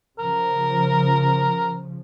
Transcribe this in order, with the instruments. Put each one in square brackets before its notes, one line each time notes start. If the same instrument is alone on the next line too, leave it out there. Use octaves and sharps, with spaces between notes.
[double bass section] C#3 F3 [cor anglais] A#4